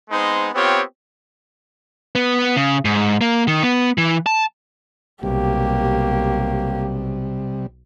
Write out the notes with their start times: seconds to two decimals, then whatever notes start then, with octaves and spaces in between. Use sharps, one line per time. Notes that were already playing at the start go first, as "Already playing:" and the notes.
0.10 G#3 B3 C4 D#4 C5
0.54 B3 C4 F4 G4 C#5
2.15 B3
2.56 C#3
2.85 G#2
3.21 A#3
3.48 D#3
3.63 B3
3.98 E3
4.26 A5
5.23 B1 C3 G3 A#3 G4